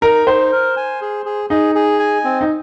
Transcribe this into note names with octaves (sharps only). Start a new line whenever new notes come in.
D#4 A#4
D#4 C5
A#4
G#5
G#4
G#4
D#4 G#4
G#4
G#5
C4
D#4